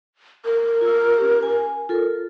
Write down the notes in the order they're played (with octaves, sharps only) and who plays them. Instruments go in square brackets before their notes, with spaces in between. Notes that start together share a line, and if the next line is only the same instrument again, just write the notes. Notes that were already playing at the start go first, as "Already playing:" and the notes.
[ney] A#4
[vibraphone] F4 E6
C#4 G4
G#5
F4 A4 A#4